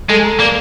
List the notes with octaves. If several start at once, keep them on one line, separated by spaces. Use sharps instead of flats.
G#3 A4
A#5
A#3 D5